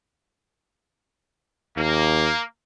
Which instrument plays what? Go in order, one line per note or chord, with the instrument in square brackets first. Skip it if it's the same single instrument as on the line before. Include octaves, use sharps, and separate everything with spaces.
[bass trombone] D#2 [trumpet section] A#3